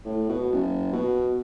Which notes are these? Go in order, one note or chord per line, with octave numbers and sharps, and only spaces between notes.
A2
B2
F#1
B2